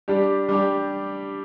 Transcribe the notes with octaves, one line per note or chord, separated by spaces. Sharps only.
G3 D4 G4
G3 D4 G4